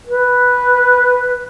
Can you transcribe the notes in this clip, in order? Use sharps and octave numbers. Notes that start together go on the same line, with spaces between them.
B4